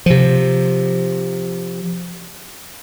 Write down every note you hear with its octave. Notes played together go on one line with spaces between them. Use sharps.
C3 F3